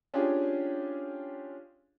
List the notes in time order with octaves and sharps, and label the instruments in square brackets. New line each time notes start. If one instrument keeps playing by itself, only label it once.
[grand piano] C#4 D4 F4 G4 G#4